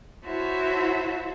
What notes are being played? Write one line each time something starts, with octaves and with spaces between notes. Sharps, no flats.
E4 F#4 A4 C5 C#5 E5